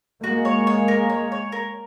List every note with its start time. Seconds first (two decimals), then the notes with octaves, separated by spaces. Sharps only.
0.23 G#3 A#3 F#4
0.45 C#5
0.67 C#5
0.88 A#4
1.09 C#5
1.32 C#5
1.52 A#4